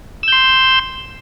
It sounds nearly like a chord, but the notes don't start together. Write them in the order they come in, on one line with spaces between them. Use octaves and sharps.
E6 G6 C6